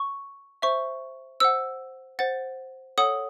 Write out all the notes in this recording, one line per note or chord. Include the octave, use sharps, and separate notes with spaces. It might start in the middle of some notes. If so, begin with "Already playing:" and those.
Already playing: C#6
C5 E5 C#6
C5 F#5 E6
C5 F#5 A6
A4 C#5 F#5 D#6